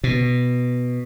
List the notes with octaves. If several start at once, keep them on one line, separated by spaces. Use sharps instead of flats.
B2